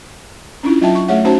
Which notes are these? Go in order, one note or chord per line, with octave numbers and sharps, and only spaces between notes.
C#4 D4 E4 F4
F#3 F4 D#5 E5 G5 A5
C#6
A3 G#4 C#5 E5 F#5
C#4 D#4 F#4 C5 A5